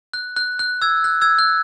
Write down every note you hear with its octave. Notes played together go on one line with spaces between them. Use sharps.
F#6
F#6
F#6
E6 G#6
F#6
E6 G#6
F#6